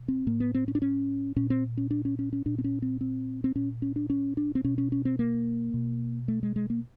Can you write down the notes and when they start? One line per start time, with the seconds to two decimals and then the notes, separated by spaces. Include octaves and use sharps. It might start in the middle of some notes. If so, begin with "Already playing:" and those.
Already playing: B2
0.08 C4
0.27 A2 A#3
0.40 B3
0.55 C4
0.68 C#4
0.75 D4
0.82 C#4
1.36 A#2 C#4
1.50 C4
1.77 C#4
1.91 D4
2.05 C#4
2.19 C#4
2.33 C#4
2.46 A#2 D4
2.58 C4
2.64 C#4
2.82 C4
3.01 C4
3.44 C4
3.55 A#2 C#4
3.82 C#4
3.96 D4
4.10 C#4
4.37 D4
4.55 C4
4.64 B2 C#4
4.78 C#4
4.92 C#4
5.05 C4
5.19 A#3
5.74 B2
6.28 A3
6.43 G#3
6.56 G#3
6.70 A#3